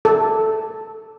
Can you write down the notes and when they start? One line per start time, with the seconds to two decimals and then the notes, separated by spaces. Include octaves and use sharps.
0.05 A4